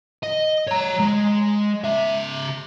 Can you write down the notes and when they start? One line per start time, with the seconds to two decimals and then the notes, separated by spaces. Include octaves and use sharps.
0.23 D#5
0.68 C#5 A#5
1.00 G#3
1.84 C#3 E5